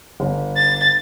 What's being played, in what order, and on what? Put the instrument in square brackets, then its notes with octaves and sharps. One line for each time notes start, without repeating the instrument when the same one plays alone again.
[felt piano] G1
[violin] A6